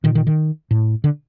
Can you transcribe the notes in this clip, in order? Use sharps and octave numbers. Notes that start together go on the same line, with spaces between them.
A#2 D#3
D#3
D#3
A2
D3